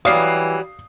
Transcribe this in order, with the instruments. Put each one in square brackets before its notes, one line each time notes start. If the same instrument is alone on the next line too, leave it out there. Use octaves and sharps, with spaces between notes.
[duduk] E3 [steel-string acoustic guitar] F#3 G3 [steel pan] D5 F5 [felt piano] D#6 C7